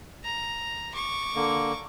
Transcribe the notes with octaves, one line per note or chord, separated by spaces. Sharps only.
A#5
C#6 D6
D3 A#3